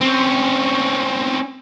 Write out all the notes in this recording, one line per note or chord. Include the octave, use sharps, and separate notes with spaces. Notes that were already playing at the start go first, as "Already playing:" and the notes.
C4 C#4